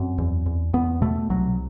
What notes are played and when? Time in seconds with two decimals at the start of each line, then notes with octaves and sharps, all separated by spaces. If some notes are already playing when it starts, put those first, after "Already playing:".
Already playing: F#2 C4
0.18 E2
0.46 E2
0.73 E2 B3
1.02 B2 A3
1.30 C2 F#3